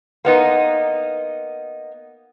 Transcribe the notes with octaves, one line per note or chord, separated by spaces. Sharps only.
A#3 B3 D#4